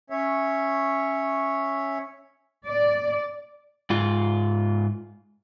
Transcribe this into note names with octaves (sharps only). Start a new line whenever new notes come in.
C#4 C#5 E5
D5
G#2 F4